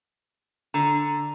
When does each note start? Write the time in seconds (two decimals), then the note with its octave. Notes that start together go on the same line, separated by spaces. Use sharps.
0.74 D3 A#5